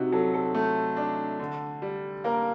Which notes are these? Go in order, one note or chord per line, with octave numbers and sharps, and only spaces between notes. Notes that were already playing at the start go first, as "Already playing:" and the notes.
Already playing: C3 D#4 F#4
F#3 A4
A4
A3
D4
D3
G3
A#3 A#4